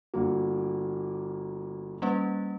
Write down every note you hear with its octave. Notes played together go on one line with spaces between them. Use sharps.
G1 A#3 F#4
G3 A#3 C#4 B4